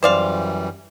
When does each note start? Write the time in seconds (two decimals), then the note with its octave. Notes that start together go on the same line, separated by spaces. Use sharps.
0.03 F#2 E3 G3 C5 D5 F5